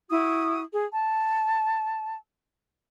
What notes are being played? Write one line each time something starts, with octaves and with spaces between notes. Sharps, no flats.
E4 F#4 D#6
G#4
A5